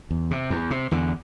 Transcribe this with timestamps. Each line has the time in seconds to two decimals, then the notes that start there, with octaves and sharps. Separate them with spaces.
0.11 E2
0.31 C3
0.50 E2
0.71 C3
0.91 E2 D3